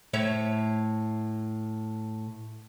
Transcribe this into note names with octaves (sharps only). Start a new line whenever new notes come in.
A2 C#5 E5